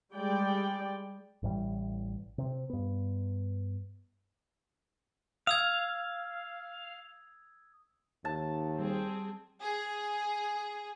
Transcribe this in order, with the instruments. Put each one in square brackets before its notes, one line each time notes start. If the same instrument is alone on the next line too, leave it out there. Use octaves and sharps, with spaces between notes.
[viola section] G3 G#3 D5 G5
[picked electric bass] A1 A2 E3 G3
C3 C4
G2 B3
[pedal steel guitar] F5 [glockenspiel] D#6 E6 G#6
[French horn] D#2 [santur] A5
[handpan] G3 [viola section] C4 G#4
[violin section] G#4